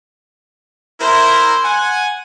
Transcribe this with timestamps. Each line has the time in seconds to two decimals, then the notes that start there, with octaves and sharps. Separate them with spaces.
1.01 E4 A#4 C5
1.65 F#5 G#5